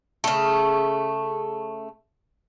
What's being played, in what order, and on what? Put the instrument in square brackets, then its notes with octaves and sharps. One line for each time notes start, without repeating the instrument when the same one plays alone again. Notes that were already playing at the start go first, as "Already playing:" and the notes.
[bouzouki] C#3 A3